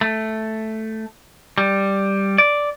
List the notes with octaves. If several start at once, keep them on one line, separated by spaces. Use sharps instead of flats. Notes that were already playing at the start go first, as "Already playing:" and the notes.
A3
G3
D5